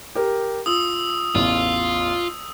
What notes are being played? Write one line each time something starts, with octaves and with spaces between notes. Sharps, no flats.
G4 A#4
F4 D#6 E6
A1 E2 F4